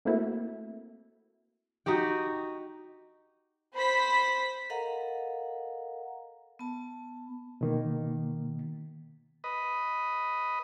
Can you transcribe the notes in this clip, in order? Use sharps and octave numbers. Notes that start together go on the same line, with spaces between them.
A3 A#3 C4 E4 F#4 A4
D#4 F#4 G4 G5
C5 B5 B6
A4 A#4 D#5 F5 F#5 A#5
B3 A5
B2 D#3 A#3
B4 D#5